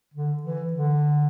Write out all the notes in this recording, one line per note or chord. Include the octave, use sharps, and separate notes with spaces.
D3
E3
D3